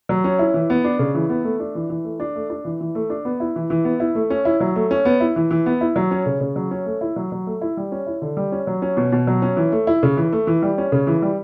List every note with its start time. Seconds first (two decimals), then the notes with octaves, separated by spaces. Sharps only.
0.09 F#3
0.24 C#4
0.39 E4
0.54 E3
0.70 B3
0.84 D4
0.99 C#3
1.15 E3
1.30 B3
1.44 A3
1.60 D4
1.75 E3
1.90 E3
2.04 A3
2.20 D4
2.35 A3
2.50 D4
2.65 E3
2.81 E3
2.95 A3
3.10 D4
3.25 B3
3.40 E4
3.56 E3
3.70 E3
3.85 B3
4.00 E4
4.15 A3
4.30 C#4
4.45 E4
4.60 F#3
4.76 A3
4.91 C#4
5.05 B3
5.20 E4
5.36 E3
5.51 E3
5.66 B3
5.81 E4
5.96 F#3
6.11 C#4
6.26 C#3
6.40 C#3
6.56 F#3
6.71 C#4
6.86 A3
7.01 E4
7.16 F#3
7.32 F#3
7.47 A3
7.61 E4
7.77 G3
7.92 C#4
8.07 E4
8.22 D3
8.37 G3
8.52 C#4
8.67 F#3
8.82 C#4
8.97 B2
9.12 B2
9.27 F#3
9.42 C#4
9.57 E3
9.72 A3
9.87 E4
10.03 C#3
10.17 E3
10.33 A3
10.47 E3
10.62 G3
10.78 C#4
10.92 C#3
11.07 E3
11.22 G3